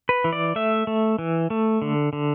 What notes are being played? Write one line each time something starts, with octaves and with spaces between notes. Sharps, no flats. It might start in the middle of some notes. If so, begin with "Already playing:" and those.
B4
E3
D5
A3 E5
A3
E3
A3
D3
D3